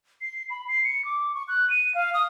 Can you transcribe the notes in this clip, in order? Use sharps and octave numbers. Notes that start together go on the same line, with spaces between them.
C7
B5
C7
C#7
D6
C#6
F#6
D#7
F5
D#6